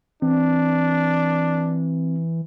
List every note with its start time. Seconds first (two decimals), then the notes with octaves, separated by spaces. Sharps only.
0.22 E3 C4 D4